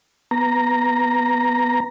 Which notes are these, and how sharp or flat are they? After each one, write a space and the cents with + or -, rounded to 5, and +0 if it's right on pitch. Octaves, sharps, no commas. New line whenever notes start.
B3 +0 A#5 +0